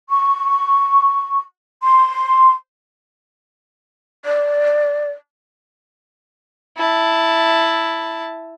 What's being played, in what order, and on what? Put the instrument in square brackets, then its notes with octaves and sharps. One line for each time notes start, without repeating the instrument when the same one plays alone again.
[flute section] C#6
C6
[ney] D5
[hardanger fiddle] E4 A5